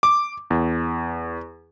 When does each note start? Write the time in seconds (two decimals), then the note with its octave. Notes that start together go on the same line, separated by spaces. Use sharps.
0.03 D6
0.50 E2